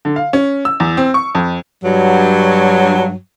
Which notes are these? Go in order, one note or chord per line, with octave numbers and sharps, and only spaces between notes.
D3
F5
C#4
E6
E2
C4
C#6
F2
G2 F#3